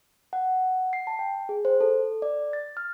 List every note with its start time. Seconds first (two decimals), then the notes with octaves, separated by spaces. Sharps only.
0.33 F#5
0.93 C7
1.07 A5
1.19 G5
1.49 G#4
1.65 C5
1.80 A4
2.22 D5
2.53 A6
2.77 F6